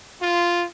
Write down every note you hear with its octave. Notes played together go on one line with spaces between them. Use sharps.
F4